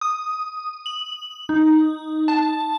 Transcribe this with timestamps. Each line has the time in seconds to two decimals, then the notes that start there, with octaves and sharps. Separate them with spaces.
0.01 D#6
0.86 F#7
1.49 D#4
2.28 A5